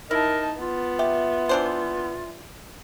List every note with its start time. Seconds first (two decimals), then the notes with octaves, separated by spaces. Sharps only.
0.11 D#4 E4 A#4 A5
0.60 B3 F4
0.99 G4 E5
1.49 E3 D4 C5